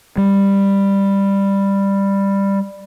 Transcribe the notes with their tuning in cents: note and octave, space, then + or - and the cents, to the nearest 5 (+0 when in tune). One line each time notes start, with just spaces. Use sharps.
G3 +10